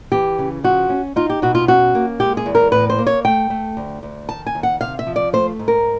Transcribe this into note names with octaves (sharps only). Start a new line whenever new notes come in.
E3 G4
C#3
F3 F#4
C#4
D#4 F4
G4
B2 F#4
F4
C#4 F#4
A#3
G#3 G4
G#4
E2
A#4
A2 B4
C5
A#3
C#5
A3 G5
A3
D2
D2
D#3 A5
G#5
D#2
F#5
C3 F5
E5
F3
D5
A3 C5
G#2
A#4